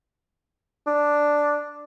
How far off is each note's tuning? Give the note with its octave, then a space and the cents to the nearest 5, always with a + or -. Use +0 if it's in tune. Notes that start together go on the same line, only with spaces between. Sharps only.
D4 +0